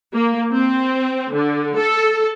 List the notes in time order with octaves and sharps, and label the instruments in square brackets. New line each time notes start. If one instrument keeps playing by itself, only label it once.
[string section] A#3
C4
D3
A4